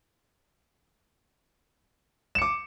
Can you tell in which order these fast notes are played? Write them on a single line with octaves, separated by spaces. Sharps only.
E7 C#7 D6